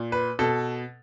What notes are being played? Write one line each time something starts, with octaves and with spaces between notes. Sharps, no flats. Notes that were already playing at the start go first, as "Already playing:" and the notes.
Already playing: A#2
B4
B2 A4